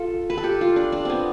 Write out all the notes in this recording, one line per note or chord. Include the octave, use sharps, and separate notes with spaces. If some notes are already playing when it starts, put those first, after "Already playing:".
Already playing: F4 A4
B4
A4
G4
F4
D4
D4
B3 C4